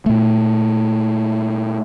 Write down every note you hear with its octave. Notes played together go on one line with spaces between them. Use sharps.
A#2 A3